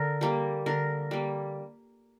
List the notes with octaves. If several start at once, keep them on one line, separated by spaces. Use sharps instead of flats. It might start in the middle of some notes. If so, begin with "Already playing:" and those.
Already playing: D3 A#4
G3 A#3
D3 A#4
G3 A#3